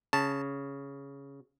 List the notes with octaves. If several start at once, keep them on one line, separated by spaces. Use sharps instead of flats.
C#3 A5